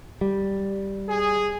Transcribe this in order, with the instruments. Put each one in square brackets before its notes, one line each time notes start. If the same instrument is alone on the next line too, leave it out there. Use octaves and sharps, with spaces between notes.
[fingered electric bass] G3
[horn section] G#4